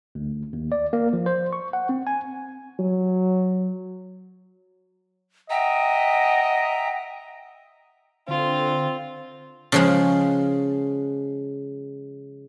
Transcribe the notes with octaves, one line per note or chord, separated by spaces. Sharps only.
D2
D#2
D5
A#3
F3
C5
C#6
F#5
C4
G#5
F#3
D#5 E5 F#5 G5 A#5
D3 C4 F4
C#3 F3 G#3